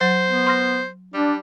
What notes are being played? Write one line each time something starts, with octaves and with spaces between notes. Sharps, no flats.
F#3 C5
B3
C6 F6 A#6
G3 D4